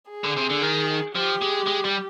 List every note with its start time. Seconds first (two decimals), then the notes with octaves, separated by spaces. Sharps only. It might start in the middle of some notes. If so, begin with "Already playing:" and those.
0.11 G#4
0.24 D3
0.37 C3
0.50 D3
0.62 D#3
1.15 F3 G4
1.42 G#3
1.66 G#3
1.85 G3